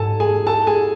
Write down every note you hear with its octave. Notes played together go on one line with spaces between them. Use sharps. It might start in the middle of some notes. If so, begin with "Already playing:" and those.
Already playing: G#2 A4 G#5 A5
G#4 G#5
A4 A5
G#4 G#5